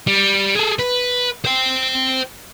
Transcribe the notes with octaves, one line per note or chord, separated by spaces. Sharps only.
G3
G#4 A4
B4
C5 G5